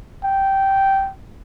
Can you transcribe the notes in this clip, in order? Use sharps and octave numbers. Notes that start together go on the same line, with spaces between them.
G5